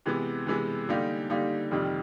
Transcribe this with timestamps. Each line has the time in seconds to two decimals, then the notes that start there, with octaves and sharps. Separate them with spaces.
0.06 C3 E3 G#3 B3
0.47 C3 E3 G#3 B3
0.89 D3 G3 A#3 D#4 G4
1.30 D3 G3 A#3 D#4 G4
1.71 F2 C3 D#3 G3